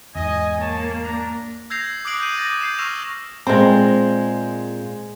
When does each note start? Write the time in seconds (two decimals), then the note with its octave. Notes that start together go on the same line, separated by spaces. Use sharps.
0.16 E2 G#2 D#5 G#5
0.61 A#3 C#5 A5
1.03 D4 A#5
1.70 E6 G6 G#6 A#6 C7 F7
2.05 D6 D#6 F#6 C7 D7 F#7
2.20 G6 D#7
2.38 D6 D#6 G6 A6 A#6
2.61 G6 C7 E7
2.79 C#6 E6 F6 A#6 E7 F7
3.47 A#2 G#3 C4 C5